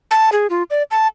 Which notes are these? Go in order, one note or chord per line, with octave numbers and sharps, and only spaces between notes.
A5
G#4
F4
D5
A5